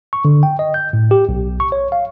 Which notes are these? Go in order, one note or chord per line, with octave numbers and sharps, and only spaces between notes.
C#6
D3
G5
D#5
G6
A2
G4
B1
C#6
C#5
F5